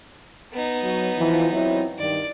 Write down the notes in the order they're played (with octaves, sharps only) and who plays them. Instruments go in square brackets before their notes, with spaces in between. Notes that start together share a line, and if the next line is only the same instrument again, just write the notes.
[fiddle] B3 D#4
[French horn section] F#3
E3 F3
F#3 C4 E4
[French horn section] G2 D#3 [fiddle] D5